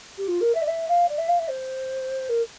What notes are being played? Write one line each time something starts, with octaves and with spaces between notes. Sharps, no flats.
G4
F4
A#4
E5
D5
E5
F5
D5
E5
F5
E5
C5
A#4